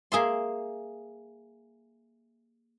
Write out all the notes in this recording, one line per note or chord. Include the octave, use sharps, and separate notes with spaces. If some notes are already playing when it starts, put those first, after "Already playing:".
A#3 G#4 E5 C6